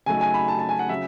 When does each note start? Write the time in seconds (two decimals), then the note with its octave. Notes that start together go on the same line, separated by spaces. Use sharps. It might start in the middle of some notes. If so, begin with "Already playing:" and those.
0.06 C#3 F#3 A3 D#4 G#5
0.21 G#5
0.34 B5
0.48 A5
0.59 A5
0.69 G#5
0.79 F#5
0.89 C#3 F#3 C#4 E5